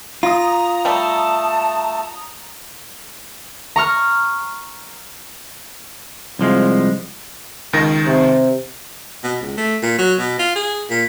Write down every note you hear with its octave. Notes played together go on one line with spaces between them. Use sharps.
F4 A#5 D#6
G3 A3 A5
A#5 C#6 F6
C2 F3 G#3
C#2 D#3 A#6
C3
B2
C#2
A3
A#2
F#3
B2
F4
G#4
A#2